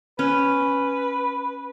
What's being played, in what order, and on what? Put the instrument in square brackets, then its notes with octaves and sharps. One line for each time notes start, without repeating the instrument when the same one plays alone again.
[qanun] C#4 [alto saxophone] B4